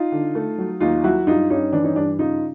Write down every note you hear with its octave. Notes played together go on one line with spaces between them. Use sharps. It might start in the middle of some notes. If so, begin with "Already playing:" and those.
Already playing: D#4 F4
D3
A3
F#3
D#2 D#4 F4
F#3 E4 F#4
G2 D#4 F4
G2 C#4 D#4
E3 D4
C#4 D#4
G2 D4
C#3 D#4 F4